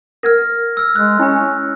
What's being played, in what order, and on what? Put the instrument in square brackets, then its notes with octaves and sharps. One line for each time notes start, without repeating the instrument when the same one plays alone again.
[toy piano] A#4 F#5 [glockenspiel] F6 G#6 A#6
[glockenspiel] E6 F6
[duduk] G#3 [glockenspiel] F#6
[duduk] C#4 [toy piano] E4 B5